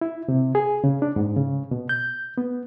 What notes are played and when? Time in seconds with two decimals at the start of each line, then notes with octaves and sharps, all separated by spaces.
0.01 E4
0.29 C3
0.55 G#4
0.84 C#3
1.02 D4
1.16 G#2
1.36 C#3
1.71 B2
1.89 G6
2.38 B3